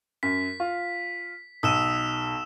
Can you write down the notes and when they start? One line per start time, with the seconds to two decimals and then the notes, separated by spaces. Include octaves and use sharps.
0.23 F#2 B6
0.60 F4
1.63 B1 D#6 E6 D#7 E7